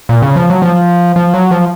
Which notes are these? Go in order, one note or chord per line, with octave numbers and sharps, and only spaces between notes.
A#2
C#3
F3
F#3
F3
F3
F#3
F3